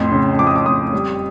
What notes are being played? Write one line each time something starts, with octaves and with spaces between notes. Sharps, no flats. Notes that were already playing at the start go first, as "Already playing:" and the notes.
Already playing: F2 A2 C6
C#3
F3 D6
D#6
D6
F2 D#6
G3